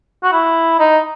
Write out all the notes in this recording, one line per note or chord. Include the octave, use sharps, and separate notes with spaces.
F#4
E4
D#4